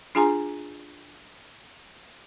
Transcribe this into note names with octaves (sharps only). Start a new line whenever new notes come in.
D4 F4 G#4 G#5 A#5 C6